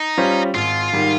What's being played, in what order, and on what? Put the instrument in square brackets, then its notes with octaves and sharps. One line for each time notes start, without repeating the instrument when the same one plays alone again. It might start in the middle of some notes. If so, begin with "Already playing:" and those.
Already playing: [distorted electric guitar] D#4
[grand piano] G3 C#4 F4 C5
[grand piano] G#1 [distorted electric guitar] F4
[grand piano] G#2 D#3 G3